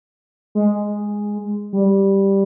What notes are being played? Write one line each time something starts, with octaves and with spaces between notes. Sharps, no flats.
G#3
G3